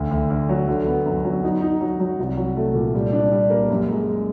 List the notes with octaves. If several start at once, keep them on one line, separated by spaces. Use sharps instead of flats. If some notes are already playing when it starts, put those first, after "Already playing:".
Already playing: D2
D2
D2
F#3
D3
B3
F#2
F#3
D#4
D#4
F#3
F#3
C2
F#3
A3
A#2
G3
D4
G3
A#3
F#2
G#3